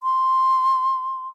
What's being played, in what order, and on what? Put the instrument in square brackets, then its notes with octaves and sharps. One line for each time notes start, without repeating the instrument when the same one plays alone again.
[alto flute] C6